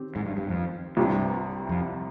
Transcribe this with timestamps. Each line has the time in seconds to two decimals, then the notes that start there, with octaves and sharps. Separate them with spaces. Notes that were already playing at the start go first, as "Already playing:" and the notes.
Already playing: D#3 C4 G4
0.16 G#2
0.26 G2
0.37 G2
0.49 F2
0.97 C2 G2 C3 G3 C4
1.69 F2